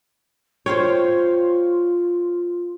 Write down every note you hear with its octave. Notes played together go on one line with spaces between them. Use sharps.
F4 C5 C#5 F5 G5